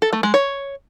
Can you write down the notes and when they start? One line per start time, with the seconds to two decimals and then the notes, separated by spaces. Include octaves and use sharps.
0.02 A4
0.13 A3
0.23 G#3
0.34 C#5